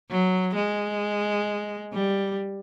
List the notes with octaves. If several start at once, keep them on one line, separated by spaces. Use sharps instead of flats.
F#3
G#3
G3